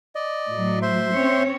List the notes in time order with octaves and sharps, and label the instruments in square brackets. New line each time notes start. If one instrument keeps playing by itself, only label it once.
[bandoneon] D5 D#5
[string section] A2 F#3
[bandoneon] C5 E5 C6
[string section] C4 C#4 C#5